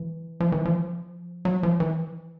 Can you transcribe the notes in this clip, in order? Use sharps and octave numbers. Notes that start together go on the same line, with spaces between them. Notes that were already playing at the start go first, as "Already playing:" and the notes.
Already playing: E3
F3
E3
F3
F#3
F3
E3